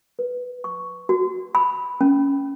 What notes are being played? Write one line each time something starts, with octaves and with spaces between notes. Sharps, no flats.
B4
C#6
F#4
B5
C#4